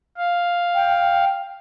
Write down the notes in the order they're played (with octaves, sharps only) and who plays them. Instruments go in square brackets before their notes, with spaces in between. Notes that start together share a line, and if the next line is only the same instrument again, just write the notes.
[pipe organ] F5
[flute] G5